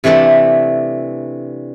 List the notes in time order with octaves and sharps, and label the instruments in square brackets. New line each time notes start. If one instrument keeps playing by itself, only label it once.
[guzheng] C3 E3 A3 D4 A5